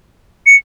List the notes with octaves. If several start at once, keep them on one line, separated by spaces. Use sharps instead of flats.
C#7